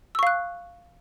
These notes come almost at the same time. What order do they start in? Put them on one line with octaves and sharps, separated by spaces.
E6 C#6 F5 F#6